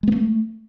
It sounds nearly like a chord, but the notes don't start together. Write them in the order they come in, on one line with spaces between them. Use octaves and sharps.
G#3 B3 A3